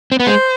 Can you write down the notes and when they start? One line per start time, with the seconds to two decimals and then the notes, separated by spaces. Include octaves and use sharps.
0.12 C4
0.20 B3
0.26 G#3 C5